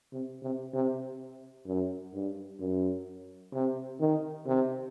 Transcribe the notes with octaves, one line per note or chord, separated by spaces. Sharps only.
C3
C3
C3
F#2
G2
F#2
C3
D#3
C3